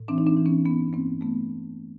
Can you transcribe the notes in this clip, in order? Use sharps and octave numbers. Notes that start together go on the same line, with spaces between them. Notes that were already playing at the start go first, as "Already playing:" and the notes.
Already playing: A2
E3 C4 D4
D#4
C4 D4
E3
B3 C#4
G2 B3 C#4
G2 A#3 C4
A3 B3